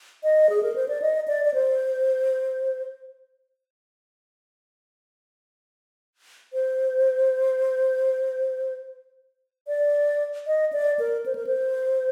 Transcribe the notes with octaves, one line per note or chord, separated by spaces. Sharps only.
D#5
G#4
A#4
C5
D5
D#5
D5
D5
C5
C5
D5
D#5
D5
A#4
C5
A#4
C5